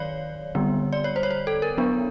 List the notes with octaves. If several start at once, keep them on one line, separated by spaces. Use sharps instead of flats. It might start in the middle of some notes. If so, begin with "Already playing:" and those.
Already playing: D#3 F#3 C#5 D5 F5
D3 G3 B3
D5
C#5
C5
C#5
C5
A4
A#4
F#3 B3 D4